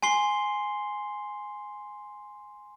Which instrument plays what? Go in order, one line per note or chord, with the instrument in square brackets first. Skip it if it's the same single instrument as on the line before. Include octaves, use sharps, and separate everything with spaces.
[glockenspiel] G#5 C6 C7 G7